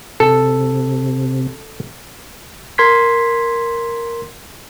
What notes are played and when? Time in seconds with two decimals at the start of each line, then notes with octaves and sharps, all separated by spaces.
0.20 C3 A4
2.78 A#4 C6 G#6 B6